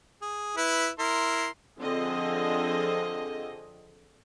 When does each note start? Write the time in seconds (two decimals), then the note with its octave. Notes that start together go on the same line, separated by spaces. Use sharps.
0.22 G#4
0.57 E4 B4
0.99 E4 A#4 C6
1.79 D3 F3 C4 G#4 D#5